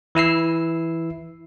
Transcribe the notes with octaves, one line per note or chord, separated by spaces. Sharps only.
E3 E4 E6 C7